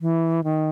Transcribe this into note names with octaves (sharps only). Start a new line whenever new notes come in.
E3
D#3